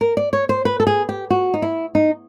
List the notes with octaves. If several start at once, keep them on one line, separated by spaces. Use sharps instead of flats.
A#4
D5
C#5
C5
B4
A4
G#4
G4
F#4
D#4
E4
D#4